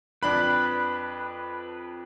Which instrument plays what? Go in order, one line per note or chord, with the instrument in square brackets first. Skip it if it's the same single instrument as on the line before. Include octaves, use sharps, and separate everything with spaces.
[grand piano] F2 D4 B5 [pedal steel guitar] B4